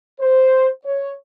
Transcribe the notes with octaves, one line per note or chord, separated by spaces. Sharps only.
C5
C#5